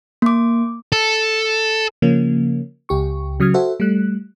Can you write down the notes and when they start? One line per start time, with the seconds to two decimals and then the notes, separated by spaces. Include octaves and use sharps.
0.22 A#3 D6
0.92 A4
2.02 C#3 F3 A#3 C#4
2.89 C#2 G4 C#6
3.40 C#3 F#3 D#6 F6 G#6
3.54 F#4 A4 C5 E5 F#5
3.80 G3 A3 F#6